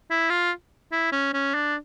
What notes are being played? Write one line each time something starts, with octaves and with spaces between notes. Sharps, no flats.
E4
F4
E4
C#4
C#4
D4